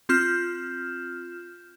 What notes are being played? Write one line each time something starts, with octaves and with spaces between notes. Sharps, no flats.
C4 F4 F6 G6 E7